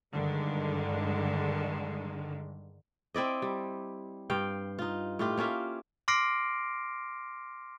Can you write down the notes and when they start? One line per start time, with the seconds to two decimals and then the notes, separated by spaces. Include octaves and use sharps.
0.13 G2 D3 D#3 G#3
3.14 C4 E4 D5 D#5
3.42 G3
4.30 G2 F5 G5
4.79 D#4 F4
5.19 A2 F4 G4
5.37 A#3 C#4 F4 E5
6.08 C6 D6 F6 A#6 C7 D7